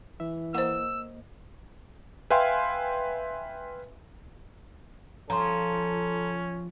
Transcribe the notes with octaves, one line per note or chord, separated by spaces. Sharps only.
E3 E5
A#3 C5 D#5 F#5 E6
B4 E5 F5 G5 G#5 C6
F3 C#4 A4 A#5 C6